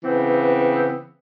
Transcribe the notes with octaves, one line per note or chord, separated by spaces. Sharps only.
C#3 E3 B3 C4